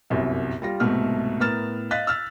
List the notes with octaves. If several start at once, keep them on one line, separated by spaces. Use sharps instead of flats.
G1 C2 F#2
G3 F4 A#6
C2 G#2 B2 A3 F6
A2 B3 A#4 F6 A6 E7
D#5 F5 F#6 A6 B6
E6 F6 A6